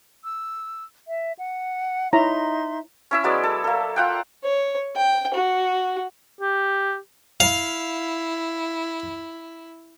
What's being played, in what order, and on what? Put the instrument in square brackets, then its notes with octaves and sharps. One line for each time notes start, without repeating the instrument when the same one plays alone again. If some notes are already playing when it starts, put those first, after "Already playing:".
[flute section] E6
E5
F#5
[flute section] D#4 E5 C6 [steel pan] E4 C#5 A#5
[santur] C#4 E4 E5
F#3 G#3 B3 D5
A4
A#3 A4
F4 F#5 G5
[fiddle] C#5
G5
F#4
[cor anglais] G4
[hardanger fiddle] E4 [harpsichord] F5